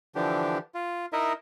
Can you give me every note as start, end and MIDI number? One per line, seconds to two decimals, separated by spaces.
0.15 0.58 50
0.15 0.58 52
0.15 0.58 53
0.15 0.58 62
0.15 0.58 67
0.74 1.06 65
1.13 1.33 63
1.13 1.33 64
1.13 1.33 70
1.13 1.33 75
1.13 1.33 76